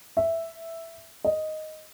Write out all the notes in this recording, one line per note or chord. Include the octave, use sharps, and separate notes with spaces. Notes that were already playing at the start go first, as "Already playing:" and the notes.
E5
D#5